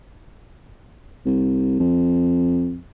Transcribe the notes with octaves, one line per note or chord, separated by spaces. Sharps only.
C2
F2